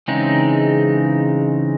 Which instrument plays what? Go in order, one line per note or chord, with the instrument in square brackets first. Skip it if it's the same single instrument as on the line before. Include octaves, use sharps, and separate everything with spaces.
[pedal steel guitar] C#3 E3 G#3 C4 D#4